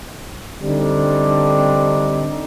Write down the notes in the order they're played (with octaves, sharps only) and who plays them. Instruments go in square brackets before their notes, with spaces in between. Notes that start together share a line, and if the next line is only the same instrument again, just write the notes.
[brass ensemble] D3 G3 C4 D4 D#4